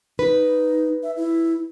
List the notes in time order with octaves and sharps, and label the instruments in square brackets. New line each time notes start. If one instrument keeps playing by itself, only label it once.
[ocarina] D#4 [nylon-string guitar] B4
[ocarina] E5
E4